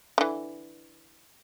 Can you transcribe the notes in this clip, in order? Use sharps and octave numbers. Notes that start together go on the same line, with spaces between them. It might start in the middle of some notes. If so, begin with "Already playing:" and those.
D3 E3